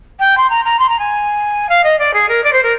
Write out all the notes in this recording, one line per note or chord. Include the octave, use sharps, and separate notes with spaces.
G5
C6
A#5
A#5
C6
A#5
G#5
F5
D#5
D5
G#4
A#4
D5
C5
A#4